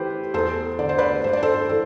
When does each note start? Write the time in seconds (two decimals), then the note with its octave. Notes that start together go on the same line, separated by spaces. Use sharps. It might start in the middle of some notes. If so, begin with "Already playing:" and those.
Already playing: E3 G4 A4 B4 C5
0.34 E2 A4 C5
0.79 D3 D5
0.89 C5
0.98 B4 D5
1.24 G2 C5
1.33 D5
1.43 A4 C5
1.69 E3 A4